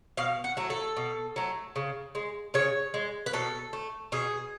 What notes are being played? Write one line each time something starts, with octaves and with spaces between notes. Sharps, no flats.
B2 F5
F#5
F#3 A3
A4
B2
F#3 A3
C#3
G#3
C#3 C#5
G#3
B4
B2 A4
A3
B2 G#4